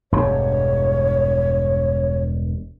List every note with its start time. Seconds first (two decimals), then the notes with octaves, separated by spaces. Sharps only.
0.12 E1 G2 C#5